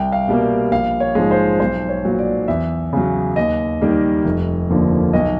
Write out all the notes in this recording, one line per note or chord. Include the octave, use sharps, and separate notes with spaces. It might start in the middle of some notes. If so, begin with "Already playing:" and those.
Already playing: C2 G5
F5
B2 G3 A#3
A#1 F5
C#5
G#2 F3 G#3
C5
B1 C5
C#5
A#2 F#3
D5
E2 E5
C#3 F#3
D#2 D#5
D#3 G3 A#3
F1
D#2 D3 F3 A#3
B1 D#5